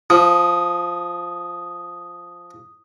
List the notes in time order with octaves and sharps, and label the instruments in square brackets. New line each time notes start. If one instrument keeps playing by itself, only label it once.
[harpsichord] F3 [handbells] D#6